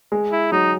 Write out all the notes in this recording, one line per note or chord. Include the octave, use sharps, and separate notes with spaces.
G#3
E4
F#3 D#4